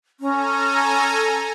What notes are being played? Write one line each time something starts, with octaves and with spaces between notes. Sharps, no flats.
C#4 A4 G#5 A#5